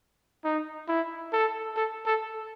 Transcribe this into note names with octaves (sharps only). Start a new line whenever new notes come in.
D#4
E4
A4
A4
A4